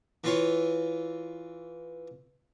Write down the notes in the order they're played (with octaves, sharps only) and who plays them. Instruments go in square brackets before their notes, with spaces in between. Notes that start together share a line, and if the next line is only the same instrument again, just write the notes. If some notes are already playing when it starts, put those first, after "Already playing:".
[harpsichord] E3 F4 C#5